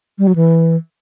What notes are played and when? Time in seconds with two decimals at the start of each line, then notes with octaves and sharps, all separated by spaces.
0.19 G3
0.27 F#3
0.36 E3